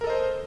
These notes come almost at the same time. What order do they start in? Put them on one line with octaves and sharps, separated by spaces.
A#4 A4 D#5 C5